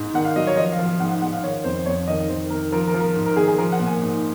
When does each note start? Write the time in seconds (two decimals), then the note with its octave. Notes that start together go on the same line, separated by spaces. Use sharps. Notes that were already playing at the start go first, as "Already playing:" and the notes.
Already playing: G#2
0.14 D#3 F#5
0.25 F5
0.36 F#3 D#5
0.47 C#5
0.57 F3 D#5
0.72 F5
0.79 F3
0.86 F5
1.00 G#2 F#5
1.11 F#5
1.22 G#2 F#5
1.33 F5
1.44 D#3 C#5
1.64 F2 C5
1.86 F2 C#5
2.08 D#3 D#5
2.29 D#3 C5
2.50 D#3 A#4
2.72 F3 A#4
2.87 A#4
2.94 F3
3.00 A#4
3.15 G#2
3.26 A#4
3.36 D#3 G#4
3.48 G#4
3.58 F3 A#4
3.72 F#5
3.80 A#2
3.86 G#5
4.01 G#2